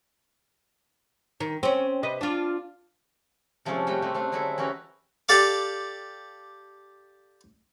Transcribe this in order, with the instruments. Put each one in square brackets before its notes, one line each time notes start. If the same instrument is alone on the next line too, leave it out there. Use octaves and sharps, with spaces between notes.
[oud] D#3
C4 C#4
C3 B4 D#5
D4 F4
[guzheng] C3 F3 G#3 A3 C#4 A4
G3 A3 F#4 G5
G3 A3 C4
A3 C4 D4
D3 F#3 G#3 E4 A4
E3 C#4 F#4 G4 A#4
[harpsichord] G4 A4 D5 F5